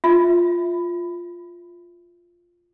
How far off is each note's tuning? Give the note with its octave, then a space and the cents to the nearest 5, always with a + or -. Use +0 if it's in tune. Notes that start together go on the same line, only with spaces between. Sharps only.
F4 +0 E5 -10